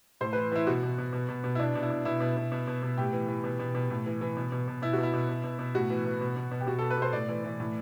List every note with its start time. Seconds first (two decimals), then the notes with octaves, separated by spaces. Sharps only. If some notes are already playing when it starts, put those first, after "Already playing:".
0.21 A2 C5
0.33 E3 B4
0.52 E3 E4
0.67 B2 F#4
0.83 B2
0.98 B2
1.13 B2
1.29 B2
1.44 B2
1.55 E4
1.59 B2 D4
1.75 B2
1.83 E4
1.90 B2
2.05 B2 E4
2.20 B2
2.37 B2
2.52 B2
2.68 B2
2.83 B2
2.97 A2 G4
3.13 E3
3.28 E3
3.44 B2
3.59 B2
3.75 B2
3.90 A2
4.06 E3
4.21 E3
4.37 B2
4.52 B2
4.68 B2
4.82 B2 E4
4.93 F#4
4.98 B2
5.03 E4
5.13 B2
5.29 B2
5.44 B2
5.59 B2
5.75 A2 F#4
5.90 E3
6.05 E3
6.21 B2
6.36 B2
6.51 B2
6.61 G4
6.67 B2 F#4
6.79 B2 A4
6.91 B4
6.97 B2 C5
7.13 A2 D5
7.28 E3
7.44 E3
7.60 A2